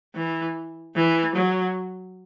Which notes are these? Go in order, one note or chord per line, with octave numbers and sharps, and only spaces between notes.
E3
E3
F#3